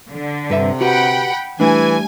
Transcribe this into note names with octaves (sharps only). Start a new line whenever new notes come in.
D3
G2 C3 B4 E5
F#4 G4 B4 F#5 G5 B5
E3 G3 A3 D4 G#5